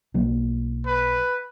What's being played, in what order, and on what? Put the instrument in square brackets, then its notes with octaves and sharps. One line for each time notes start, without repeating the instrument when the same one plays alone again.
[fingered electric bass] B1 F#3 A#3
[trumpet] B4